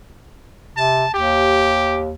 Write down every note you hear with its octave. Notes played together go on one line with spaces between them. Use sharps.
C3 A5
D#2 G4